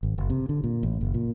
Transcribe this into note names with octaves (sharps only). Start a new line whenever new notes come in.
G#1
F#1
C3
D3
A#2
A1
F#1
A#2